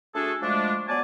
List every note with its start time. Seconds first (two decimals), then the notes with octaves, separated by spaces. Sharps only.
0.15 A3 D4 F#4 G#4 A4
0.43 F3 G#3 A3 D4
0.88 F#3 B3 D5 G#5 A5 D6